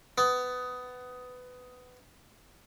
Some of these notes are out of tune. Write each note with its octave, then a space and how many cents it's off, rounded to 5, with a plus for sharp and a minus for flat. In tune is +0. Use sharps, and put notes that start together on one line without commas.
B3 +20